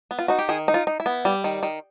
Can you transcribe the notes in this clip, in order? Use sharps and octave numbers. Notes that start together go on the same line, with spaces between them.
B3
F4
D#4 F#4
G4
D#3 G#4
D#4
F4
D#4
E4
B3
G3
D#3
D#3